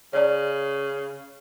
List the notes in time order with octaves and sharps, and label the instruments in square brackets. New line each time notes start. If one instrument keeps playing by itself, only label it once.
[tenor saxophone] C#3 [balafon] C#5 D5